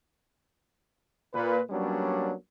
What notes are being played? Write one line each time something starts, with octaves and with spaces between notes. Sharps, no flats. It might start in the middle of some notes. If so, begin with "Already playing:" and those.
A#2 B4
F#3 G3 A#3 B3 C#4 D4